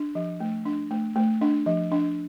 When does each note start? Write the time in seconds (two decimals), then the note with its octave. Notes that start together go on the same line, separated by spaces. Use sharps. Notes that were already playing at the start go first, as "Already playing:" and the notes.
Already playing: D4
0.15 F3
0.40 A3
0.65 D4
0.91 A3
1.16 A3
1.41 D4
1.66 F3
1.92 D4